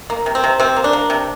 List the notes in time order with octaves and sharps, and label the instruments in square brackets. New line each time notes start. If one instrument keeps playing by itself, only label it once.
[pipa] A#3
C3
C4
C3
C3 C4
A#3
D4
A#3
C3